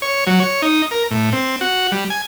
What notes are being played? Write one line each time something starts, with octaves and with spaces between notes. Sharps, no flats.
C#5
F#3
C#5
D#4
A#4
A2
C4
F#4
G3
G#5